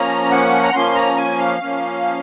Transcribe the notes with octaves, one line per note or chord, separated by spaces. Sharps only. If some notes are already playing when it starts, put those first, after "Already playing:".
Already playing: F3 A#3 C#4 A#5
F#5
A#5
F3 A#3 C#4 C6
A#5
G#5
F5
F3 A#3 C#4